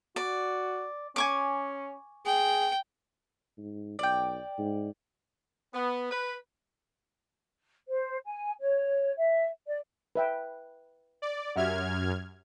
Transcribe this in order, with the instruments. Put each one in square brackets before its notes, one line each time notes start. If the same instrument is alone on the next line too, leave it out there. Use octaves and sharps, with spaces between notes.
[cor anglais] F#4 [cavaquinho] D5
[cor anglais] C#4 [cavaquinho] G#5 C#6 D6
[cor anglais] G#4 [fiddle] G5
[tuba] G#2
[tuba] B1 [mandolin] D5 G5
[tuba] G#2
[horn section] B3
B4
[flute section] C5
G#5
C#5
E5
D5
[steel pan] B4 E5 G5
[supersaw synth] D5
[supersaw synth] F#2 F6 G#6 [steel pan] G4 E5 F#5